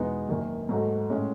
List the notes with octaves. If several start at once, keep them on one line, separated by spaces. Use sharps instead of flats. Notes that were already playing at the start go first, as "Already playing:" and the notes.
Already playing: E2 B2 G#3 B3 D#4
F#1 F#2 D#3
G#2 F#3 A3
A2 G#3 C#4